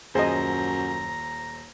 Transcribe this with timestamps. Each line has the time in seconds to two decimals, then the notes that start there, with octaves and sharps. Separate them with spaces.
0.15 D#1 F#2 G#4 C5 D#5 A#5